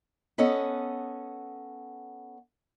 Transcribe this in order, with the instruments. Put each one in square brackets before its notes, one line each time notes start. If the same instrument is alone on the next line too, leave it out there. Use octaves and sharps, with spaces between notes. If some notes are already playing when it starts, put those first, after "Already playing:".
[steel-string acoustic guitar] B3 C#4 A4 D#5 F#5